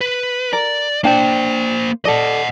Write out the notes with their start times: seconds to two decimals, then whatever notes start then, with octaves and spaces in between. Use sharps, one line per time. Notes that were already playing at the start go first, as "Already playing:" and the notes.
0.01 B4
0.53 A#4 D5
1.04 A#3 D4 C5 G5
2.05 A4 D5 D#5 F#5